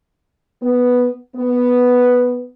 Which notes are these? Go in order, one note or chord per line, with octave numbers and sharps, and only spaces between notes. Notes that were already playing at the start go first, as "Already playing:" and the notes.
B3
B3